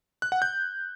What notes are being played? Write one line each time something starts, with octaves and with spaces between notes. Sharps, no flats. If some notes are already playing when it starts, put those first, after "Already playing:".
F#6
F#5
G6